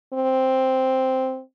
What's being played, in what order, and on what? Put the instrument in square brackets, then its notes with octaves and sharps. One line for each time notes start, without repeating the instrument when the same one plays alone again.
[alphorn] C4